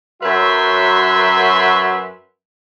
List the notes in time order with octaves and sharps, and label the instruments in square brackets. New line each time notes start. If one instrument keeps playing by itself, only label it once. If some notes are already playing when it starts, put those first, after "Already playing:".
[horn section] F#2 F#3 F#4 B4 E5 C6